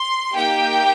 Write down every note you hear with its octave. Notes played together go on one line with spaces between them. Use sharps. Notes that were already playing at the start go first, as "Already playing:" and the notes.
Already playing: C6
A#3 D#4 G4 G5